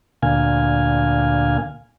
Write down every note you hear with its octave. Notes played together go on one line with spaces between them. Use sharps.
D2 A#2 F5 G#5